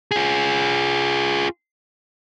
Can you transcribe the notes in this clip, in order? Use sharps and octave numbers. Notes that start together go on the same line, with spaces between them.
F4 G#4